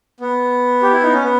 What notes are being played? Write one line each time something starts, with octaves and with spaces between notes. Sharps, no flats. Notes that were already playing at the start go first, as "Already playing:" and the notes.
B3
G4
E4
D#4
C#4
B3